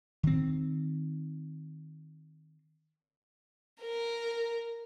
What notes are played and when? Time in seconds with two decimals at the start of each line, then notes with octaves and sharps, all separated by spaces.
0.23 D#3 C4
3.81 A#4